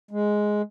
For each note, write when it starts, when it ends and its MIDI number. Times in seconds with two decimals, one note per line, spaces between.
0.11 0.62 56